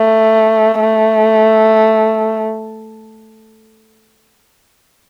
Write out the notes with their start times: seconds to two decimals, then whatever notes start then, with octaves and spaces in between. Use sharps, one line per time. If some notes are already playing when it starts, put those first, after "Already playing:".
Already playing: A3
0.81 A3